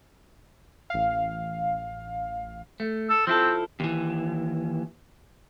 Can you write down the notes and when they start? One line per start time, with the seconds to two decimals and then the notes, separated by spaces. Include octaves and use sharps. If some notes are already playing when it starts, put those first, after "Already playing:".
0.90 A1 F5
2.80 A3
3.09 A4
3.27 F3 C4 E4 A4
3.80 D#2 E3